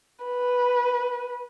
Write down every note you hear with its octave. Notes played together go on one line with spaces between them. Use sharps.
B4